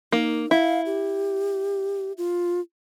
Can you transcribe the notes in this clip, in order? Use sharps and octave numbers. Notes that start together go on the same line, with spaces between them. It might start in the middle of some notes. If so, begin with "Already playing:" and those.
A#3 D#4
E4 F5
G4
F4